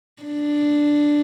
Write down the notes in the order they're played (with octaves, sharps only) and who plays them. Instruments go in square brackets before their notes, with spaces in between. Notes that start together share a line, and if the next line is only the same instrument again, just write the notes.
[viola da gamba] D4